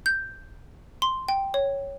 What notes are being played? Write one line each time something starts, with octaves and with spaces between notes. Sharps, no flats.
G6
C6
G5
C#5